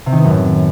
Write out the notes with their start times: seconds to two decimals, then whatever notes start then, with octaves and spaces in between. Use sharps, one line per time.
0.06 C3
0.12 D#3
0.18 B3
0.24 F#2
0.30 A2